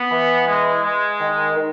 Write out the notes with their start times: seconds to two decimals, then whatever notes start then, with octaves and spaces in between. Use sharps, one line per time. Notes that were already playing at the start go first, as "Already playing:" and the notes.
Already playing: B3
0.11 E3
0.46 G#3
0.83 G#3
1.19 D#3
1.55 D#3